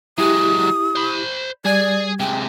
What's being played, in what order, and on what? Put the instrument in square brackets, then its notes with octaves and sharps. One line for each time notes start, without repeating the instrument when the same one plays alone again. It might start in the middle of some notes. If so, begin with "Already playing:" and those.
[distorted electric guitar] F#3 G#3 [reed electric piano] E4 G4 [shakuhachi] D#6
[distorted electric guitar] C5 B5
[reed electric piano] G3 G#6 [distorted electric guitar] G#4 G#5 [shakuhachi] D5
[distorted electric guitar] C3 G#3 [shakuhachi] G5